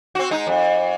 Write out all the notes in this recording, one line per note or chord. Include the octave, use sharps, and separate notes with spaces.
C4 F#4
G#3 D#4
F2